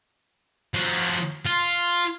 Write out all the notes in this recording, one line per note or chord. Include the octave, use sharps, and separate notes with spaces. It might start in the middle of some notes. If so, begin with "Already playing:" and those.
F3 F#4
F4